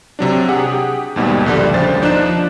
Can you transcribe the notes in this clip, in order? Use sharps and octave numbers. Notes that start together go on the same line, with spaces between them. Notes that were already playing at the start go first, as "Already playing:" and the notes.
C3 F#3 D4
G4 G#4 F#5
D#2 G#2 B2 G3
A#1 D3 G3
D#2 C#3 C5 A6
F3 D4 D#4 F#6 E7